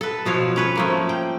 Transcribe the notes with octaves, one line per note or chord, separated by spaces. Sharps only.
A4 B4
B2 F3 C#5 F5
C#4 B4 C#5
F3 A3 A#3
G5